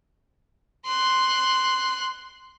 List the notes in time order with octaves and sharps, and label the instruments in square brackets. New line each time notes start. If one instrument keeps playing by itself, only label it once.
[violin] C6 F#6